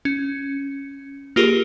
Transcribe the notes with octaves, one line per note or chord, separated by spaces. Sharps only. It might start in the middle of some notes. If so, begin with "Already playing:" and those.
C#4
A#3 F4 G4 G#4 A#4